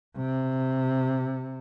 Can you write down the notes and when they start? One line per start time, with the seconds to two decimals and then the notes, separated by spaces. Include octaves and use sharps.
0.17 C3